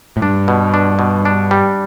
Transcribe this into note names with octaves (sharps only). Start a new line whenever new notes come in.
A2
G2 D4
B2
D4
B2
D4
G3